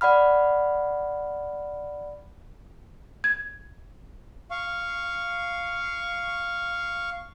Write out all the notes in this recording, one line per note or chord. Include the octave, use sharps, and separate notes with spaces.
D5 F#5 B5 F6
G#6
F5 C#6